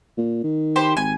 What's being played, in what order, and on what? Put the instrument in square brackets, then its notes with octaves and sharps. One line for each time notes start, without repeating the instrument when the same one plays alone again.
[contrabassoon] A#2
D#3
[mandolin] G4 C5 B5
[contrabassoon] G#1 [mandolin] G#5